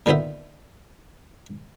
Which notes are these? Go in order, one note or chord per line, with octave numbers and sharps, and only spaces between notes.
A#2 D3 D#3 B3 C5 E5